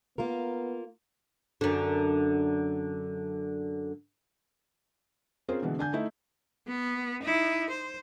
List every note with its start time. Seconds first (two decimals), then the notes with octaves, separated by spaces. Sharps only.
0.18 A#3 B3 F4 A#4
1.61 F#2 D3
5.49 C4 C#4 F4 G#4 A#4
5.62 B2 D3 E3 G#3
5.78 D3 D4 G#5 G6
5.93 A3 D#4 E4
6.67 B3
7.23 D#4 E4
7.69 C5